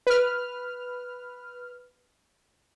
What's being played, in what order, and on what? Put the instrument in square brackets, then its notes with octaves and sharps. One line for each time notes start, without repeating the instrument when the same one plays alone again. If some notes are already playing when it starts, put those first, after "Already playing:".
[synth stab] B4 F6